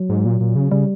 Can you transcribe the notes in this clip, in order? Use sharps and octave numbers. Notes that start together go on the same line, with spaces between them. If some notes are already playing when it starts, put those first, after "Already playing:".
Already playing: F#3
G#2
A#2
A#2
C#3
C#3 G3